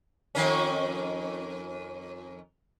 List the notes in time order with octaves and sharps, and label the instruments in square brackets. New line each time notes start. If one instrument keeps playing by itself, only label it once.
[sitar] F2 D#3 C#4